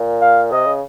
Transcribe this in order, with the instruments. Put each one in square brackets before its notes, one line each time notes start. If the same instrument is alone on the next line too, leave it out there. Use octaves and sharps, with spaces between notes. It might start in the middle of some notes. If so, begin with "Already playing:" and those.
Already playing: [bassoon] A#2
[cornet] F5
[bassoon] C3 [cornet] D#5
[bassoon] C#3